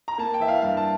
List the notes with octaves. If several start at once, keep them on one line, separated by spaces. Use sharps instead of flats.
A#5
A#3 A5
G5
E3 E5
F5
G2 F5
A5